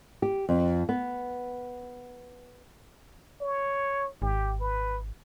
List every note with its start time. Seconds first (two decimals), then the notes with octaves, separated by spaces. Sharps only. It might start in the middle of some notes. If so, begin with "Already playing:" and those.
0.22 G4
0.49 F2
0.89 B3
3.41 C#5
4.22 G#1 G4
4.60 B4